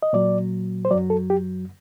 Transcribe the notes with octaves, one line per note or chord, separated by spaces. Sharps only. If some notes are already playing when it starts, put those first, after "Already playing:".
D#5
A#2 F#3 D5
C5
F#2 F#3 D5
A4
G4